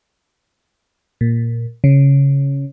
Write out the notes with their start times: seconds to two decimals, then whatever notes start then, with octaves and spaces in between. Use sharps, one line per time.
1.21 A#2
1.84 C#3